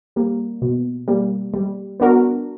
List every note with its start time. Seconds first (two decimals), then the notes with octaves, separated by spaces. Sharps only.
0.16 G3 A#3
0.62 B2
1.08 G3 A#3
1.54 G3
2.00 B3 D4 F#4 A#4